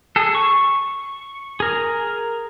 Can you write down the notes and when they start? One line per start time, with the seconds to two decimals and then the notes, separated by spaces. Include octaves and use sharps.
0.16 G#4 A4
0.35 C#6
1.60 G#4 A#4